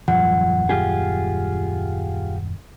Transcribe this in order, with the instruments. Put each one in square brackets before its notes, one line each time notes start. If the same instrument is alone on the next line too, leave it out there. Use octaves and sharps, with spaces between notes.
[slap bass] D#1 F#2 G3 [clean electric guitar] F3 [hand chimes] F#5
[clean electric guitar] F4 G4 G#4